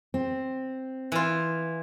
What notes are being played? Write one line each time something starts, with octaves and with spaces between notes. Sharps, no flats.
C4
E3 F4